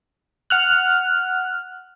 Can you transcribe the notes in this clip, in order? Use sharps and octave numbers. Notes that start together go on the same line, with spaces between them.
F#5 F6 F#6